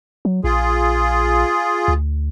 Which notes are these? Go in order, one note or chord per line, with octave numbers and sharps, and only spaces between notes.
F#3
A#1 F4 G#4
D2